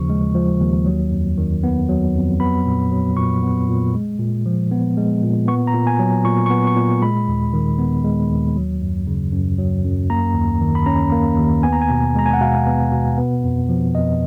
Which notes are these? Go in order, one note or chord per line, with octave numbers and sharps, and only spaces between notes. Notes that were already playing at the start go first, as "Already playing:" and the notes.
Already playing: D#2 C#3 F3 C#6
G#3
F3
D#2
F#3
F2
D#3
B3
F#3
F2
B3 B5
A#2
F#3
A#2 C#6
B3
A#2
G#3
A#2
F3
B3
G#3
A#2
B3 C#6
A#5
A#2
G#5
F#3
A#2 C#6
B3 C#6
C#6
A#2
G#3 B5
D#2
D#3
B3
G#3
D#2
F#3
F#2
C#3
F#2
F#3
F#2
A#3 A#5
D#2
D#3
B5
C#4 A#5
A#3
D#2
B3 G#5
A#5
G#5
B2
G#3 A#5
G#5
F#5
B2 F5
B3
B2
B3
F2
F3
F2 D#5